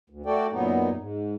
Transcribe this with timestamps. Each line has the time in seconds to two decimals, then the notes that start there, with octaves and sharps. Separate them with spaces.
0.10 D2
0.26 A3 F#4 A4 D5 G5
0.52 F#2 A#2 F#3 B3 D#4
0.96 G#2